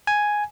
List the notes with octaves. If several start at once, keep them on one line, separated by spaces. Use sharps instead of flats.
G#5